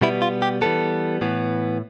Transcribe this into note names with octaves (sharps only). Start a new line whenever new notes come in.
B2 G3 B3 E4
F4
G4
E3 G3 B3 A4
A2 E3 B3